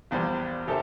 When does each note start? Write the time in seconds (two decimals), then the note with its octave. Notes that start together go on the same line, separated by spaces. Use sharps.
0.11 A#1 E2 G3 C5
0.67 G#1 G4 A4 A#4 C5 E5